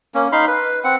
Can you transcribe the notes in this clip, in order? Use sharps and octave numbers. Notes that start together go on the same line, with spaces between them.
A#3 C#4
D#4 F5 B5 C6
B4
C4 F#5